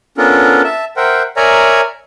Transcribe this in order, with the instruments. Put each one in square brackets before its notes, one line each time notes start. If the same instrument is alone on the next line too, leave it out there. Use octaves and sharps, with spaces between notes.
[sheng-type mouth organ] B3 C#4 D4 F4 A4 A#4
E5 A5
A#4 C5 E5 F#5 G5
A#4 C#5 D5 E5 G#5 A#5